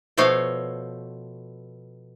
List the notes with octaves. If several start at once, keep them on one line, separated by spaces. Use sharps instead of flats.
B2 F3 A3 C#5 F5